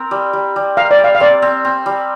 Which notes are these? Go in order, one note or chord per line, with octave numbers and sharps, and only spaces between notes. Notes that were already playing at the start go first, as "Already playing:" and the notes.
Already playing: C4 A#4
G3
G3
G3
A#4 F5
D5
G3
F5
F5
C4 D5
C4
C4
G3